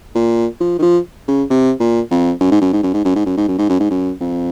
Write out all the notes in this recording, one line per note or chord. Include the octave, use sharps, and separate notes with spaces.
A#2
F3
D#3
F3
C#3
C3
A#2
F2
F#2
G#2
F#2
G#2
F#2
G#2
F#2
G#2
F#2
G#2
F#2
G#2
F#2
G#2
F#2
F2